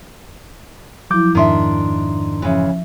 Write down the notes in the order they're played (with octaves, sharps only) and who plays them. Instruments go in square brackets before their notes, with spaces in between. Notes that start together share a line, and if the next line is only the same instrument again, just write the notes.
[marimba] F3 E4 [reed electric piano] F#3 D6 G6
[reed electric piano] F2 G#2 C6 [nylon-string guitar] D#3 D4 E5
[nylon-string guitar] C#3 E3 [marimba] F3 E5